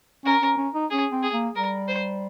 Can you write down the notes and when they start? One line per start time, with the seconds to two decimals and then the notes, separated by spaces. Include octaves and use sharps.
0.25 C#4 A#4
0.42 C#4
0.57 C#4
0.74 D#4
0.90 C#4 G#4
1.12 C4
1.23 G#4
1.33 A#3
1.55 G3 A#4
1.88 C5